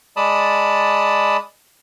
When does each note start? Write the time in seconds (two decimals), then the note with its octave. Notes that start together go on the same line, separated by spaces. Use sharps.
0.17 G#3 D5 A5 B5 D#6